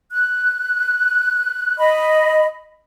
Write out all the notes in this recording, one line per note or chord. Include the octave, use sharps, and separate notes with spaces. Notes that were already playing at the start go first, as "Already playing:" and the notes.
F#6
D#5 B5